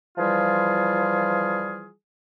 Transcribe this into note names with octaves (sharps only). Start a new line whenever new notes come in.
E3 F3 G3 F4 G#4